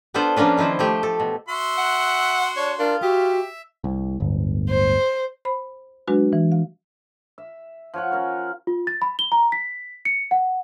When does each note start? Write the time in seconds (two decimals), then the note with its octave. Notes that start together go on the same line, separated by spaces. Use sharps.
0.14 B3 D4 F4 A4 B4 C5
0.37 F3 A#3 C#4 D4 B4
0.57 D#3 F3 E4 C5
0.79 F3 A3 G4
1.03 A4
1.20 B2
1.48 F#4 E5 C6
1.78 F#5
2.57 D4 C#5
2.79 D4 F4 A#4
3.02 F#4 G4 E5
3.84 C2
4.20 D1 G1
4.69 C5
5.45 C5 B5
6.08 F#3 G#3 D4 F#4 B4
6.33 E3
6.52 F5
7.38 E5
7.94 F3 C#5 F#5
8.11 C#4 A#4 C#5
8.67 F4
8.87 A6
9.02 B5
9.19 G7
9.32 A#5
9.52 B6
10.05 C#7
10.31 F#5